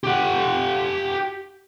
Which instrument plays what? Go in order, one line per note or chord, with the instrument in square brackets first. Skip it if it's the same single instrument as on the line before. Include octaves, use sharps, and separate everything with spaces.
[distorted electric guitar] G4 F#5